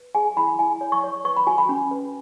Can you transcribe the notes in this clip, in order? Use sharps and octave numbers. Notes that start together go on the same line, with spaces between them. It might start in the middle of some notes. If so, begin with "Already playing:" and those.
Already playing: B4
G#4 G#5
E4 B5
E4 G#5
C#5
C#6
C#5
B4 C#6
B5
F#4 G#5
B5
C#4
B4